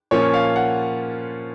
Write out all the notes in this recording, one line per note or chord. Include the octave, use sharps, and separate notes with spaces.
A#2 F3 A#3 C#4 F4 C#5
F5
F#5